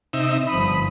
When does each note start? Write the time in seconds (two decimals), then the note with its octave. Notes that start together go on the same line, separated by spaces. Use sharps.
0.13 C3 D#4 E5
0.49 G1 F3 B5 D#6